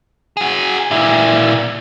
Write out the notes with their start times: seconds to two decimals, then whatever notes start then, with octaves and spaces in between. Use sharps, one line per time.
0.37 F#4 G#4
0.91 A#2 E4